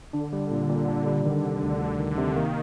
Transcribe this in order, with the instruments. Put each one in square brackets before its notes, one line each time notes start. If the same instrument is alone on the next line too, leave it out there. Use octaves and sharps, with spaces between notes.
[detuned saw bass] D3 [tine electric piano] D4
[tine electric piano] G3
A#2
A#2
D4
G3
[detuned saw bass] D3 [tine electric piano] D#3
[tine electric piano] C3
D2
D2
D#3
C3
[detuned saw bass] D#3 [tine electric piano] A#3